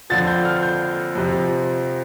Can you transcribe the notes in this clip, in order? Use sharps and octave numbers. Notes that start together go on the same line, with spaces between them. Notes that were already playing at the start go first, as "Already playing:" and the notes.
F2 D3 F3 A6
G6
F6
G6
F2 C3 F3